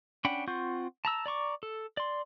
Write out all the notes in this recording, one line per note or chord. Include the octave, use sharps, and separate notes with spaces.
C#4 D4 F#5 G5 B5
C4 F4 F#5 C#6 G6
A5 A#5 E6
D5 A#5 C#6 D6
A4
D5 C6